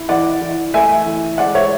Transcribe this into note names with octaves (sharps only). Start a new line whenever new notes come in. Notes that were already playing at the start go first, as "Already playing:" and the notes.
Already playing: E4
E3 D5 F#5
E3
A3 E5 G#5
E3
G#3 D5 F#5
C#5 E5